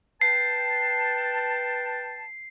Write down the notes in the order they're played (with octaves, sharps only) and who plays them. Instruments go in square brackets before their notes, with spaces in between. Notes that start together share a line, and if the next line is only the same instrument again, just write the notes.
[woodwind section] B4 G5 A5 [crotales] C7